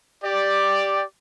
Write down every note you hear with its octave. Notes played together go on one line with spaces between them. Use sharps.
G4 D5